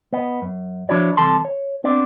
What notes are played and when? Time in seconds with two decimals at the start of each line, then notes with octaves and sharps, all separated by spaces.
0.13 B3 D#5
0.42 F#2
0.89 F3 D4 E4 F#4 C#5 D5
1.17 C2 C3 E3 A4 A5 C6
1.45 C#5
1.84 B3 C4 D4 D5